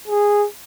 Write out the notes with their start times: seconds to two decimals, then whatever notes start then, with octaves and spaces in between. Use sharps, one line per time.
0.08 G#4